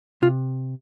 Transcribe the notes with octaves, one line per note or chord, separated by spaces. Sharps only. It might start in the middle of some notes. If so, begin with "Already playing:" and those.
C3 F4